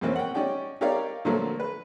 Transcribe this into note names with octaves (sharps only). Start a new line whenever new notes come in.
F2 B2 E3 A#3 C4 C#4
F#5 G5
C#4 D#4 G4 D5 G5
D#4 G4 A#4 C#5 D5 F5
A#2 D3 F3 F#3 A3 A#3
B4